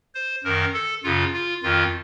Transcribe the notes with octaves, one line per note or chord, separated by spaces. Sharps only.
C5
F#2 D#3 A#4
A4
F#2 C#3 F4
F4
F2 D#3 F4